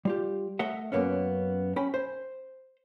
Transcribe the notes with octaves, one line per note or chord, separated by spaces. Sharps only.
G3 F4 G4
A3 D#5 E5 F#5
F#2 B2 A#3 B3 C#4
C#4 G5 B5
C5